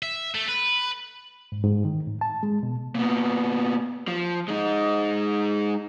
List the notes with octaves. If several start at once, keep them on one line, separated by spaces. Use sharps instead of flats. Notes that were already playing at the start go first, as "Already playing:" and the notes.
E5
A3
B4
G#2
G#2
D#3
A2
A5
G#3
B2
A#2 B3
F3
G#3 D#4